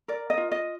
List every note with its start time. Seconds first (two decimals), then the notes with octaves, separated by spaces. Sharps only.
0.08 A#4 D5
0.30 D#5
0.37 F4
0.52 D#5